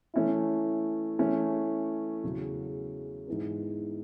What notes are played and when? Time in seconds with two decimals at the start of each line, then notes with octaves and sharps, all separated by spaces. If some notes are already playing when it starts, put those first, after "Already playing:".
0.14 E3 A3 C#4 E4
1.19 E3 A3 C#4
2.24 E2 C#3 F#3
3.28 G#2 E3 B3